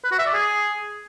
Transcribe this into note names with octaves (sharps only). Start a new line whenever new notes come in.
B4
F#4
E5
D5
G#4